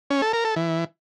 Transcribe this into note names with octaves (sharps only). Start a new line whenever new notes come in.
C#4
A4
A#4
A4
E3